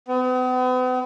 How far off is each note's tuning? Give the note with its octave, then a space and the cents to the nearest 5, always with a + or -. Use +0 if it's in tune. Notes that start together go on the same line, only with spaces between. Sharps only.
B3 +45